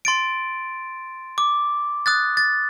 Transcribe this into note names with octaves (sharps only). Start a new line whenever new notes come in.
C6 A6 D7
D6
D#6 F#6 A6
A6